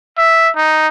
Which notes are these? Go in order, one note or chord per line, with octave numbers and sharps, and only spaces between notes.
E5
D#4